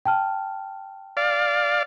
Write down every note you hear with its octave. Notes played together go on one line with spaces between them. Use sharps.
G5 A5 F6
D5 F5